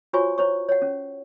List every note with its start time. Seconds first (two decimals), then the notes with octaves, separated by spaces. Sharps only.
0.13 F4 F#4 C5 C#5 G#5 C#6
0.38 E4 C5 C#5 C#6
0.69 C#5 F#5
0.82 C#4